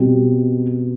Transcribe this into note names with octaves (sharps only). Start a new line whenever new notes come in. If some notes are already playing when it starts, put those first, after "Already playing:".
Already playing: B2 G3 C4